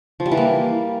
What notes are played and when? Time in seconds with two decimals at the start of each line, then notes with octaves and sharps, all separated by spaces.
0.20 F3
0.26 G3
0.31 E3
0.37 A#3